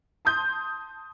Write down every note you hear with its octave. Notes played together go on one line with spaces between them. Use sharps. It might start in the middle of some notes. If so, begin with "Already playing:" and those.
A5 C6 D#6 G6